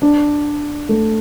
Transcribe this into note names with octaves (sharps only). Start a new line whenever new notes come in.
D4
A3